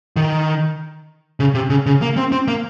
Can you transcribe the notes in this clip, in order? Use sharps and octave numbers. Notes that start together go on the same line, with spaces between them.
D#3
C#3
C3
C#3
C#3
A#3
C4
C4
A#3